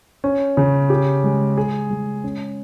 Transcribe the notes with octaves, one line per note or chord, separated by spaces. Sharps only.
C#4
C#3
G4
G#3
G#4
G#3
C#4